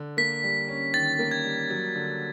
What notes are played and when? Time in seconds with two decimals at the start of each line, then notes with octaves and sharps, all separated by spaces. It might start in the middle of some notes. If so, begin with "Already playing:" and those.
Already playing: D3
0.17 A#3 B6
0.43 G3
0.68 C#4
0.94 D#3 A6
1.19 A#3
1.31 G#6
1.44 G3
1.70 F#3
1.96 D3